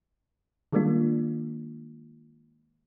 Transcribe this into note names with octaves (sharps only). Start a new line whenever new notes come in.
D#3 G3 G#3 A#3 D4 F4